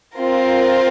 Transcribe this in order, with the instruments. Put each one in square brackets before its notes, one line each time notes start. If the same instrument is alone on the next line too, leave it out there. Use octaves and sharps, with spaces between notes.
[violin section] C4 F4 A#4